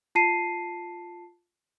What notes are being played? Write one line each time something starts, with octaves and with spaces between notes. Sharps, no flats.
F4 A5 C7 D#7